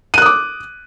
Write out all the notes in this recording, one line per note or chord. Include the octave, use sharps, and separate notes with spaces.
D6 D#6 F#6 D#7